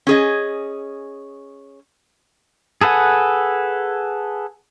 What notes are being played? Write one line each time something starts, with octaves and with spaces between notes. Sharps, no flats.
C#4 G#4 D#5
G#4 A4 B4 F#5 G#5